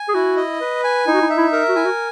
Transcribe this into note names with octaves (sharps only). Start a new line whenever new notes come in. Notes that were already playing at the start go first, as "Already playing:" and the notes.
Already playing: G#5
G#4
E4 F#4
D#5
B4
G#5
D#4 E4
F#4
E4
E5
E4
A#4
F#4
E4 G#5
F#4